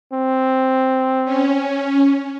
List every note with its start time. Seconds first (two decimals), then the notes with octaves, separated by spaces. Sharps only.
0.13 C4
1.25 C#4